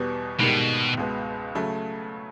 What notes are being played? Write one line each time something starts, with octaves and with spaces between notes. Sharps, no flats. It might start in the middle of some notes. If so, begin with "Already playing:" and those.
Already playing: E2 B2 G3 B3
G#2 B2 D#3 G3 A#3
C#2 B2 G#3 B3
C#3 F#3 A3